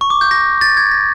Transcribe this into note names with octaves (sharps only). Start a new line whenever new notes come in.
C#6
D6
G6
A#6
A6
G#6
A#6